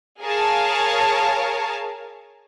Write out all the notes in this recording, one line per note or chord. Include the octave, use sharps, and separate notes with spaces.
G#4 A#4 C#5 F5 A5